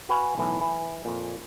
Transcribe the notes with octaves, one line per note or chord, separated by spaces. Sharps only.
F#4 B4 F5 G#5
B1 A2 E3
E3
F2 A#2